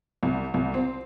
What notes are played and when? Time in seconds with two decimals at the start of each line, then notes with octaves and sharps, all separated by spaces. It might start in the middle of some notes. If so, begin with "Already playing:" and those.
0.23 C2
0.54 C2
0.74 C4